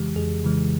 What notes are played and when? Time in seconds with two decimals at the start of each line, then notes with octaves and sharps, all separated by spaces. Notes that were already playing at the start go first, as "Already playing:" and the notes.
Already playing: F2 C#3 E3 G#3 G4
0.16 F2 G#4
0.44 C#3 E3 G#3